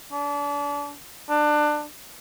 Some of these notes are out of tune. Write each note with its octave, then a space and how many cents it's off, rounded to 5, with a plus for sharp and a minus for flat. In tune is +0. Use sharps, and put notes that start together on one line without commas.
D4 -35
D4 +25